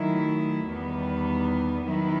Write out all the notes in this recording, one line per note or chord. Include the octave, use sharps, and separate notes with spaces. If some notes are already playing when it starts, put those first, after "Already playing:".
Already playing: D#3 F#3 A3 E4
E2 D#3 G3 B3
D#3 F#3 B3 E4